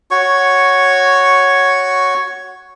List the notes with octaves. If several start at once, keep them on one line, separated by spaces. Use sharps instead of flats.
F#4 C#5 C#6